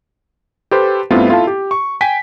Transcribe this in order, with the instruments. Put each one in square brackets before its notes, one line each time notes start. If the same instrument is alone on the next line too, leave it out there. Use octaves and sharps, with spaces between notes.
[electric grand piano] G4 A4 B4 C5
G2 A3 B3 C4 E4 F4
E4 F4 A4 F5 A5
G4
C#6
G5 G#5 B6